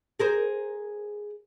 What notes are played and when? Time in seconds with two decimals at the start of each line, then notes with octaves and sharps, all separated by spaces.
0.19 G#4 A#4 C5